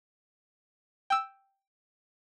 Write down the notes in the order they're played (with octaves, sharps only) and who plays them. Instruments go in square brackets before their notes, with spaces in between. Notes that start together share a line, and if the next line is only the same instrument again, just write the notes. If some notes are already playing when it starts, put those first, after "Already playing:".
[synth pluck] G5 E6